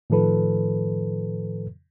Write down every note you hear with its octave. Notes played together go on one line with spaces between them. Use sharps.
A2 D#3 F3 A4 B4